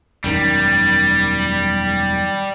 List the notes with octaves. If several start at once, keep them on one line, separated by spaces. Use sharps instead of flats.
E1 F#2 D#3 G3